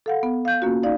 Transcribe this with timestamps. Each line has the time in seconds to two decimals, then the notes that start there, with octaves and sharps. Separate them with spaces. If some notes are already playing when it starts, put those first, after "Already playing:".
0.06 A4 F5 F#5
0.23 B3
0.45 F5 G6
0.62 A#3 C#4 F4 F#4
0.83 D#4 D5 F5